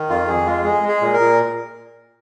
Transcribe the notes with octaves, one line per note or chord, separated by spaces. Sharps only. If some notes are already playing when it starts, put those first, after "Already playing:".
Already playing: D#3
F2 F4
F2 G#4
G#3 F4
G#3 G#4
G#3
G#4
A#2
A#4
A#2